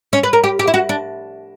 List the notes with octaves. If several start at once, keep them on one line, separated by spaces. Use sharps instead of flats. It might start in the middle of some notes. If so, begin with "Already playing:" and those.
C#4
B4
A#4
G4
G4
E4
F#4
D4